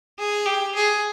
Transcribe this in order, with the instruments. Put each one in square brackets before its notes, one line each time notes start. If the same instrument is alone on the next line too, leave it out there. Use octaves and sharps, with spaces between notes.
[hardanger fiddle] G#4
G4
G#4